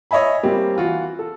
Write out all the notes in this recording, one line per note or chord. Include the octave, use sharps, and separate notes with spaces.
C#5 D#5 E5 G#5 B5
G3 A#3 C4 G4
E3 F4 F#4
A4